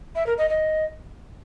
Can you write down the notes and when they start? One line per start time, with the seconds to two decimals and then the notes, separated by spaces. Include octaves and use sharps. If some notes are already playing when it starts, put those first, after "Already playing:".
0.15 E5
0.27 A#4
0.38 D#5
0.49 D#5